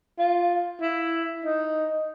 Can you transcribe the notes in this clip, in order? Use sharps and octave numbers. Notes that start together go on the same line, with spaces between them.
F4
E4
D#4